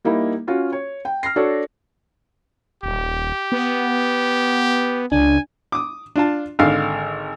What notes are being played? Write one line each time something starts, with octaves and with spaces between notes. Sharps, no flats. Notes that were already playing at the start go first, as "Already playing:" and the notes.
G3 A#3 D#4 E4
C#4 F4 F#4
C#5
G5
F6 A#6 C7
D4 F#4 A4 C#5
D#1 G4
B3
C#2 D4 G#5
D6 D#6
D4 F4 A5
G#1 D3 F5